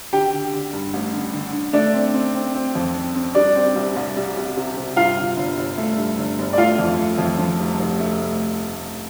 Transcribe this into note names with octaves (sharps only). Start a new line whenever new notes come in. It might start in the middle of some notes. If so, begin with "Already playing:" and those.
D3 G4 G5
D3
D3
G2
A1
D3
D3
D3
A3 D4 D5
C4
C4
C4
C4
F2
C4
C4
G3 D4 D5
C4
C2
C2
C2
C2
C3
C3
G2 F4 F5
D3
G1
G1
A3
G2
G1
G1
D5
A3 F4 F5
F2
A3
F2
F3
F1
F1
A3